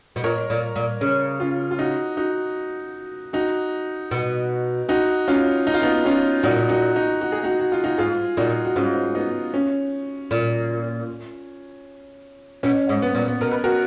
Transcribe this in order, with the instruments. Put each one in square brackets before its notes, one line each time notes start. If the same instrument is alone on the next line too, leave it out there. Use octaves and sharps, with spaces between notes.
[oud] B2
[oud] A#2 [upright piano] A#4 C#5
[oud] A#2
A#2
[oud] C#3 [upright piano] C#4
[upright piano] C#4 F4
F4
D#4 F#4
D#4 F#4
D#4 F#4
[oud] B2
[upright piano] D#4 F#4
C#4 F4
D#4
F4
B3 D#4
C#4 F4
[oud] A#2 [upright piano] D#4 F#4
[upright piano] D#4 F#4
D#4 F#4
F#4
G#4
D#4 F#4
F#4
F4
D#4 F#4
[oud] G#2 [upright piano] F4 G#4
[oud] A#2 [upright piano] D#4 F#4
[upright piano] F#4
[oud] G#2 [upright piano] C#4 F4
[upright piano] B3 D#4
C#4
[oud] A#2
[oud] B2 [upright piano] C#4
[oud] G#2
[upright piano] B3
[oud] A#2
[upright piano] B3
[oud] B2 [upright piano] A#4
[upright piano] B4
F#4 A#4